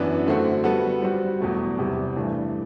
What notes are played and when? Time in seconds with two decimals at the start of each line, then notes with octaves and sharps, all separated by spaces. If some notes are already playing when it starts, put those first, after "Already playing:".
Already playing: F#2 E3 B3 D4
0.26 D3 A3 C4 F#4
0.64 G3 B3 F#4 A4
1.02 G3 C4 F#4
1.40 E2 B2 F#3 A3
1.78 E2 C3 G3 C4
2.16 G2 E3 A3 D4